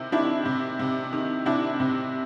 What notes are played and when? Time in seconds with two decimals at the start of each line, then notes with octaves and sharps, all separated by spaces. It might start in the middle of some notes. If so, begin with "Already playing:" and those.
Already playing: C3 D#3 E4
0.12 D#3 D4 E4
0.46 C3
0.80 C3
1.13 D#3
1.46 C3 D4 E4
1.80 C3